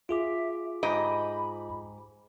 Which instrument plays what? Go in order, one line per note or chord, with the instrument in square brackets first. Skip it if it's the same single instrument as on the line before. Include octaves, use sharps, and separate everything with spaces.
[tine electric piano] F4 G#4 D6 [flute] E5
[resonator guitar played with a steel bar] G#2 G4 D#5 [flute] B5